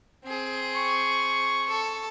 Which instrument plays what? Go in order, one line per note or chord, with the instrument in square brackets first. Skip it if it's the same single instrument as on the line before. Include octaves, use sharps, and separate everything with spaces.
[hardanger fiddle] C4 G#4
[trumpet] C#6
[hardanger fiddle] A4